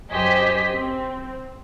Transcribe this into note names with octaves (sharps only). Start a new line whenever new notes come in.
F#2 G4 C5 D#5 G#5 B6
C4